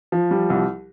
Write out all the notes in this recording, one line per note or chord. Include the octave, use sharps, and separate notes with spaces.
F3
G3
C2